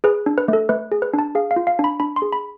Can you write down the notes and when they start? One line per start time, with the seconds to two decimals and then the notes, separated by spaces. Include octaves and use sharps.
0.04 G#4 B4
0.26 D4
0.38 B4
0.48 A3 A4
0.69 A3 B4
0.92 G#4
1.02 B4
1.14 D4
1.19 A5
1.35 G#4 F5
1.51 F5
1.56 F4
1.67 F5
1.79 D4
1.84 B5
2.00 D4 B5
2.16 C6
2.22 G#4
2.33 B5